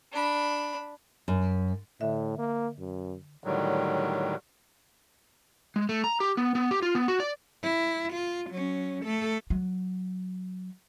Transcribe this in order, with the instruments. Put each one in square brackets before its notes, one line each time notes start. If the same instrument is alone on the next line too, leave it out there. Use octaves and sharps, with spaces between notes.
[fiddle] D4 B5
[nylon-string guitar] F#2
[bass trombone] A2 [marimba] D3 E5
[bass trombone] A#3
F#2
[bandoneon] A2 D3 D#3 F#3 G3
[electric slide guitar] G#3
A3
A#5
G4
B3
B3
G4
F4
B3
F#4
D5
[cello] E4
F4
F#3 C#4
A3 A4
[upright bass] F#3